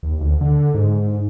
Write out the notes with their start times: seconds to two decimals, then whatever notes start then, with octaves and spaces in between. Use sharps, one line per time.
0.03 D#2
0.21 D2
0.41 D3
0.74 G#2